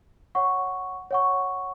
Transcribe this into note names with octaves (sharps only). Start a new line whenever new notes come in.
C#5 F#5 C#6
C#5 F#5 C#6